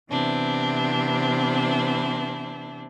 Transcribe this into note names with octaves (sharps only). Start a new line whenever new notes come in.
C3 E3 B3 C4 D4 E4